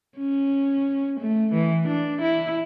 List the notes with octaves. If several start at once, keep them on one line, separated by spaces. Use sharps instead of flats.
C#4
A3
E3
D4
E4